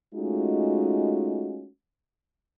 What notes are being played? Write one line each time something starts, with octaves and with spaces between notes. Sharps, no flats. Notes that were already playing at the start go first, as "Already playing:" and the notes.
G#3 A3 C#4 D#4 F4 F#4